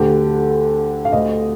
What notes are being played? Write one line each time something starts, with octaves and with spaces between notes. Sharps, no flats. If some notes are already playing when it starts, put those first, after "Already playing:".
Already playing: D2 D3 G4
F5
D2 D3 D#5